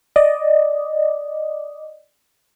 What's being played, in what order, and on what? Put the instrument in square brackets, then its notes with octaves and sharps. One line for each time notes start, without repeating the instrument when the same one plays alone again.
[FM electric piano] D5 D#5